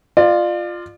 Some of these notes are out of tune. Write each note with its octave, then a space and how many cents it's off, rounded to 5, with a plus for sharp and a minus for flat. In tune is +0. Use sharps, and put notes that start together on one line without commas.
F4 +0 D5 +35